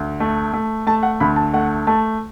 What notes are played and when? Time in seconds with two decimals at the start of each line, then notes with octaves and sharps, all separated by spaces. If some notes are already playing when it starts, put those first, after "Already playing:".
Already playing: D2
0.20 A3
0.53 A3
0.87 A3 A5
1.03 F#5
1.20 D2 B5
1.36 A5
1.53 A3 F#5
1.87 A3 A5